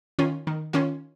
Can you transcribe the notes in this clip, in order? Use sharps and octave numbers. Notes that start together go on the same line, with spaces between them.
D#3 C#4 F4
D#3
D#3 C#4 F4